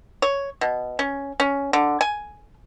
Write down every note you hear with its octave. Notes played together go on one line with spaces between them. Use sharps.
C#5
B2
C#4
C#4
D3
G#5